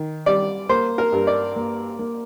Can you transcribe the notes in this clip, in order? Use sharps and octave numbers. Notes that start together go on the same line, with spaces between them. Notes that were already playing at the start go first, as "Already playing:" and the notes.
Already playing: D#3
G3 D5
A#3 C5
A#4
G2
D5
A#3
A#3